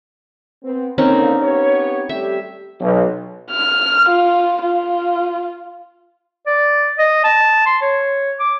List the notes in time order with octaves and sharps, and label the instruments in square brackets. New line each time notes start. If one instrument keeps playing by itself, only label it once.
[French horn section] B3 C4
[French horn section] D3 A#3 [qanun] C4 C#4 D#4
[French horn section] B3 G4 C#5
[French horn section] G3 A3 G4 [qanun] E5
[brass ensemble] B1
[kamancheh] F6
F4
F4
[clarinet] D5
D#5
A5
C6
C#5
D6